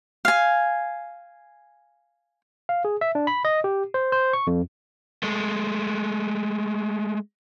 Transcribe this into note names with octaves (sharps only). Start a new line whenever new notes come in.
F5 G#5
F5
G#4
E5
D4
B5
D#5
G4
C5
C5
C#6
F2
G#3 A3